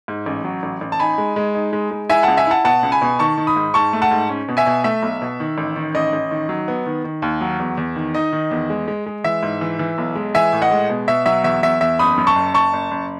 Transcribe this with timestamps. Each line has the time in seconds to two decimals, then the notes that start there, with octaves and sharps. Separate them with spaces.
0.08 G#2
0.26 A1
0.44 F#3
0.63 A1
0.81 A1
0.92 A5
1.00 D#4 G#5 B5
1.18 G#3
1.36 G#3
1.55 D#4
1.73 G#3
1.91 G#3
2.09 E4 E5 G#5
2.23 C#2 F#5 A5
2.37 E5 G#5
2.47 E4 F#5 A5
2.64 B2 F#5 A5
2.83 C#2
2.92 G#5 B5
3.02 B2
3.19 D#3 A5 C#6
3.37 D#3
3.47 B5 D#6
3.56 G#2
3.74 G#2 A5 C#6
3.93 A3
4.02 F#5 A5
4.11 G#2
4.29 C#4
4.48 B2
4.57 E5 G#5
4.66 B2
4.84 A3 E5
5.02 B1
5.22 B2
5.40 D#3
5.58 A1
5.76 D#3
5.95 A1 D#5
6.13 A1
6.31 D#3
6.49 F#3
6.68 B3
6.86 D#3
7.04 D#3
7.22 D#2
7.41 F#3
7.59 E2
7.77 E2
7.96 D#3
8.14 D#4 D#5
8.33 D#3
8.51 E2
8.70 G#3
8.88 G#3
9.06 G#3
9.24 E3 E5
9.43 G#2
9.61 E3
9.79 E3
9.98 B1
10.16 G#3
10.35 E3 E5 G#5
10.53 A2
10.62 D#5 F#5
10.71 G#3
10.90 B2
11.08 B2 E5
11.26 F#3 E5
11.44 E2 E5
11.63 E2 E5
11.81 E2 E5
11.99 F#1 B5 D#6
12.18 F#2
12.27 A5 C#6
12.35 F#1
12.54 F#1 A5 C#6
12.73 F#1
12.91 F#1